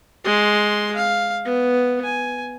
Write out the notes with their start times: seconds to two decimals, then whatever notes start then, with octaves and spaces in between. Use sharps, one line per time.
0.24 G#3 C6
0.96 F5
1.45 B3
2.04 G#5